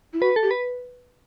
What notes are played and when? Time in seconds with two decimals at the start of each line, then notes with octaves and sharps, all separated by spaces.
0.13 E4
0.21 F#4 B4
0.36 A4
0.43 G4
0.51 B4